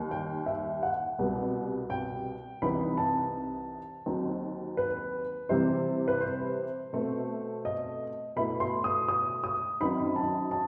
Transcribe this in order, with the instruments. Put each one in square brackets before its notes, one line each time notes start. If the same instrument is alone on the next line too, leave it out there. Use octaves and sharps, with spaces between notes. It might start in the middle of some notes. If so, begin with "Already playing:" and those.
Already playing: [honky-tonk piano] D#2 D#3 G3
[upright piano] G5
E5
F#5
[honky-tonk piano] C2 B2 G3
[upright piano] G5
[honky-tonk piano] C2 C3 E3 B3 D#4 [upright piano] B5
[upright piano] A5
[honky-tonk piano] D#2 D#3 F#3 C4
[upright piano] B4
[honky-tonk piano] C3 E3 G3 C4 E4 [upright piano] C5
[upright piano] B4
C5
[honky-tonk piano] B2 A3 C4
[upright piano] D#5
[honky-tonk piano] B2 A3 E4 [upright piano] B5
[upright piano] C6
D#6
D#6
D#6
[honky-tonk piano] F#2 D#3 F#3 C4 D#4 [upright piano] B5
[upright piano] A5
A5